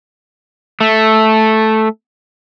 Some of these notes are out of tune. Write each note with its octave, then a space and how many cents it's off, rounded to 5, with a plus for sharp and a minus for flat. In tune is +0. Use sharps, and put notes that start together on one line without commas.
A3 -5